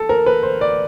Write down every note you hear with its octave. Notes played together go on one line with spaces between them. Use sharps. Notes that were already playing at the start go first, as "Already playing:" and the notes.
Already playing: A4
A#4
B4
C5
D5